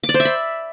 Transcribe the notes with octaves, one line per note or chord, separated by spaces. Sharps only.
D6
D5
C5
E5
B5